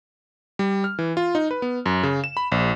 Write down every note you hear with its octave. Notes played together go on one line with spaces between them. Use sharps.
G3
F6
E3
F4
D#4
B4
B3
F#2
C#3
E7
B5
A#1